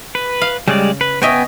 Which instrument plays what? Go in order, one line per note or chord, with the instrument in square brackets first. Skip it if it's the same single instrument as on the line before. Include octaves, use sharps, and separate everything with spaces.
[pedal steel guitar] B4
[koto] F5
[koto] C#3 [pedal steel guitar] G3 G#3 D5
[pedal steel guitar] B4
[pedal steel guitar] B3 G5 G#5 [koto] C#5 D#5 E5